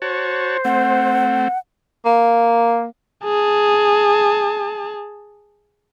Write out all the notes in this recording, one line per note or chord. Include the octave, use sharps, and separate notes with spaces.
F#4 C5 C#5 A5
A3 C4 F#5
A#3
G#4 A5